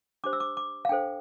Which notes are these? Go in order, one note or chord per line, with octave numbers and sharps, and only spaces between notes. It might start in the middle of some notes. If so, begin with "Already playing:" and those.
D4 G4 C5 D6
E6
D6
D6
F5
D4 A4 C5 G5